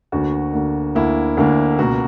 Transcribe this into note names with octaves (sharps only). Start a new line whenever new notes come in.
D2 D3 A#3 F#4
D2 D3 A#3
D2 D3 A#3 E4
D2 D3 A#3
C#2 B2 A#3 F#4